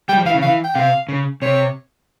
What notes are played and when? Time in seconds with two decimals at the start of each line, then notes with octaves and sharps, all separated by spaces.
0.09 G3 G5
0.17 F3
0.25 E3 F5
0.34 C#3
0.43 E3 F5
0.64 G5
0.75 C3 F5
1.09 C#3
1.42 C3 C#5